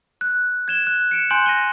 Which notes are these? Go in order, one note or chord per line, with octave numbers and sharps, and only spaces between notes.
F#6
G#6 E7 G7
F#6
C#7 D7 E7
G#5 C6 F#6 G6 D7 F#7
A#6 D#7 G7